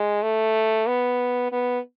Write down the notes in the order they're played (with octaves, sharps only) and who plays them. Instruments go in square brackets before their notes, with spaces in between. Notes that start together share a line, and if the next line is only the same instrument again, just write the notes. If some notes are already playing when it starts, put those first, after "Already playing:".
Already playing: [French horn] G#3
A3
B3
B3